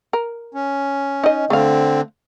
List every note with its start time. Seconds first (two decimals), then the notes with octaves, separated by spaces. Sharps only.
0.13 A#4
0.54 C#4
1.24 D#4 D#5
1.50 D3 A3 C4 A4 F5